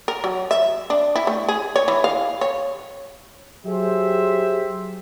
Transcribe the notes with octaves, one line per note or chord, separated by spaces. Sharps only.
A#4
F#3
E5
D4
E4
A3
G#4
C#5
E3
F5
C#5
F#3 G4 G#4 C5 E5